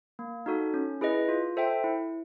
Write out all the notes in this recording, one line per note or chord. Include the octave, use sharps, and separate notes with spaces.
A#3
D#4 F#4 A4
C#4
E4 G#4 B4 D#5
F4
A4 C5 E5 G5
E4